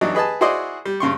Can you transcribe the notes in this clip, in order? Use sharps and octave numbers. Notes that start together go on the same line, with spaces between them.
E3 F#3 D4 D#4
G#4 B4 D#5 G#5 A5
E4 F#4 G#4 C5 D5 D#5
G3
G2 C#3 C6 C#6